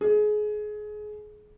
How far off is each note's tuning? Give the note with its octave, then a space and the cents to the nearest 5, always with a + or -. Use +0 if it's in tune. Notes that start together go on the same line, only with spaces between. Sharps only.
G#4 +25